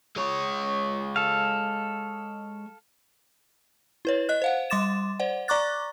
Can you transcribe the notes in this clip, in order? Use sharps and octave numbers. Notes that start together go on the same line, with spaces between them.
G#3 C#5
A4 F5
E4 B4 C#5
D#5 F#6
C5 F5 F#5
G3 C6 D6 A6 E7
C5 D5 F#5
D5 A#5 C#6 D6 F#6 A6